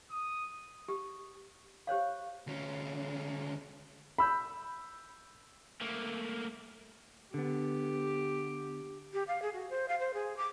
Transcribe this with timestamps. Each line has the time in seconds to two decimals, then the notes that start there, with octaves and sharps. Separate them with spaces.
0.11 D#6
0.88 G4
1.87 G4 C5 C#5 F5
2.47 D2 C#4
4.18 B5 E6 G6
5.81 A3 A#3
7.34 D3 B3 G4
9.14 G4
9.28 F5
9.42 G#4
9.54 F#4
9.70 C5
9.88 F5
10.00 C5
10.14 G#4
10.37 D6